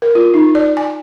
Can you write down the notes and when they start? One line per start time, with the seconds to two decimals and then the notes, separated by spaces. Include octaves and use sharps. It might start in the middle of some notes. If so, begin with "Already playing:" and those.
0.02 A#4
0.15 F4
0.34 D#4
0.55 D5
0.77 G#5